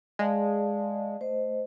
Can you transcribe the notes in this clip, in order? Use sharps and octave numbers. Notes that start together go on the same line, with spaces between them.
G#3 D5 F5 A5
A3 C5 D#5